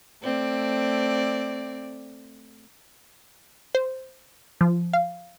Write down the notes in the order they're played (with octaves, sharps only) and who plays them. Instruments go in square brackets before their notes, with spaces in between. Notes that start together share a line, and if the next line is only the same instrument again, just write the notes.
[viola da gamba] A3 C4 D5
[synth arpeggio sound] C5
F3
F5